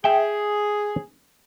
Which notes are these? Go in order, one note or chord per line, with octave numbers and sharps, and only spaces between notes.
G#4 E5 G5